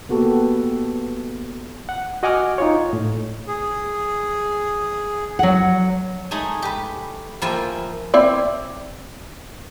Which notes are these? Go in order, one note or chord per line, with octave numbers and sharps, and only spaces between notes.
A#3 B3 F#4 G4 A4
F#5
F#4 D#5 F#5 G#5 D6 F6
D#4 F4 C#5
A2
G#4
F#3 F#5
G#3 A3 D#4 G#4
G4 B4
F3 A#3 E4 G5 G#5 C6
C4 E4 D5